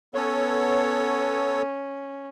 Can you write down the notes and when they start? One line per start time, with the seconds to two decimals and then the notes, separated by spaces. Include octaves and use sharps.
0.14 B3 C#4 A4 C#5